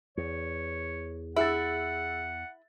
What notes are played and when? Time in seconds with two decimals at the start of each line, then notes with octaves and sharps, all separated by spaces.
0.17 E2 C#5
1.36 E4 G#4 F#5 E6 A6